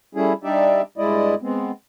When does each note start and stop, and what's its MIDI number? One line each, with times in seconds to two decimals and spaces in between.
0.15 0.33 55
0.15 0.33 57
0.15 0.33 61
0.15 0.33 64
0.15 0.33 68
0.44 0.82 55
0.44 0.82 62
0.44 0.82 63
0.44 0.82 67
0.44 0.82 74
0.44 0.82 76
0.98 1.35 43
0.98 1.35 56
0.98 1.35 64
0.98 1.35 74
0.98 1.35 75
1.42 1.71 56
1.42 1.71 59
1.42 1.71 60